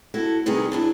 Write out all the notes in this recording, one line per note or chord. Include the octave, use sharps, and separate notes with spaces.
E4 F#4 A4
C3 D#3 G3 B3 G#4
F#2 D4 E4